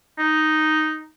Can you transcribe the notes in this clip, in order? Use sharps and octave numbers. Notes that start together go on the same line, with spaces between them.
D#4